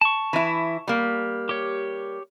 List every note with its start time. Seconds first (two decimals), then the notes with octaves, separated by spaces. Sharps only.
0.01 A5 C#6
0.33 E3 E4
0.88 G3 A#3
1.49 G4 C#5